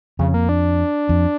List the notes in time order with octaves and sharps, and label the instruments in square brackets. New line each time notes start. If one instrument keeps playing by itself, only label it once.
[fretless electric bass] F2 [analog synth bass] C#3
[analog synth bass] A#3
D4
[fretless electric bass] F2